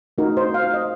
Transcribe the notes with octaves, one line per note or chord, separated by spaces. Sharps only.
A3 D#4 F#4 A#4
C5
F5
D#5